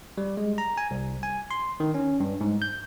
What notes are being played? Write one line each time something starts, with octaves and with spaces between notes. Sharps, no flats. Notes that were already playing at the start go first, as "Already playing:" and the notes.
G3
G#3
A#5
G#5
C2
G#5
C6
D#3
C#4
G2
G#2
G6